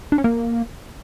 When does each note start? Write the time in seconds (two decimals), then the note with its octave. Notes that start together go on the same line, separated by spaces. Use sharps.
0.12 D4
0.18 C#4
0.24 A#3